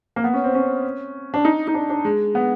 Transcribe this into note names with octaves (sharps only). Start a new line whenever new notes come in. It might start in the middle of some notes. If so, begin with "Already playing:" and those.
A#3
B3
C#4
C4
C#4
D4
D#4
D#4
D4
D4
G#3
B3